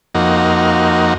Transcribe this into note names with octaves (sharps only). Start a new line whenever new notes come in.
F2 A#3 D#4 F#4